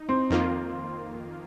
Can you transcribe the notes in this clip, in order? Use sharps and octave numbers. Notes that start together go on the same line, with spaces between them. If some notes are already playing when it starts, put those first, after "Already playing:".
Already playing: D#4
C4
F2 D#3 A#3 F4